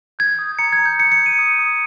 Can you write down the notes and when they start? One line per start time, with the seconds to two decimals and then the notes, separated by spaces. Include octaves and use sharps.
0.19 G6 G#6
0.39 D#6
0.59 A#5 C#7
0.73 G#6
0.79 A#5
0.86 G6
0.99 G6 C#7
1.12 C#7
1.19 G6
1.26 D#7
1.39 D#6
1.59 D#6